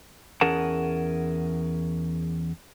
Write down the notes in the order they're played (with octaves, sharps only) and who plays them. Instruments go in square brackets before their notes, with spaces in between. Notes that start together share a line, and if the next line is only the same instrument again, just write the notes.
[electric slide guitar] E2 C#4 G#4 A#4 F#5 A5